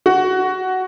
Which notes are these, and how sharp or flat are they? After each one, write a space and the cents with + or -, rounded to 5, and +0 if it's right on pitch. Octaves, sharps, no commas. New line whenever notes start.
F#4 +10